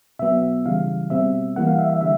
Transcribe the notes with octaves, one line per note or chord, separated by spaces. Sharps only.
B2 F#3 B3 E5
C#3 E3 G3 F5
B2 G3 C4 E5
E3 G3 A#3 F#5
F5
E5
E5
D3 G3 E5